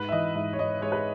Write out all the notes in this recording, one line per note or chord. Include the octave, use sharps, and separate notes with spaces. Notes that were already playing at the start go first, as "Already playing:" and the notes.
Already playing: G#2 B4
E5
E3 D#5
G#2 E5
C#5
G#2 D#5
G#3 C#5
B4